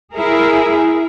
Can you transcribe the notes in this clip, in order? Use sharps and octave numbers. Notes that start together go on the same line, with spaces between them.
E4 G#4 A#4